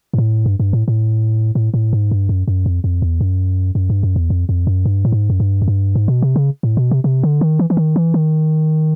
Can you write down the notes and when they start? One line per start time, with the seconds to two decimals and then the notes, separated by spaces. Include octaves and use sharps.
0.13 G#2
0.18 A2
0.46 G2
0.60 G2
0.73 A2
0.88 A2
1.55 A2
1.74 A2
1.93 G#2
2.11 G2
2.29 F#2
2.48 F#2
2.66 F2
2.84 F2
3.02 E2
3.21 F#2
3.75 F#2
3.90 G2
4.03 F#2
4.16 E2
4.30 F2
4.49 F2
4.67 F#2
4.85 G2
5.05 A2
5.12 G#2
5.30 F#2
5.40 G2
5.62 F#2
5.68 G2
5.95 G#2
6.08 B2
6.22 C3
6.36 C#3
6.63 A2
6.77 B2
6.91 C3
7.04 C3
7.23 D3
7.41 D#3
7.59 E3
7.70 E3
7.77 D#3
7.96 E3
8.14 D#3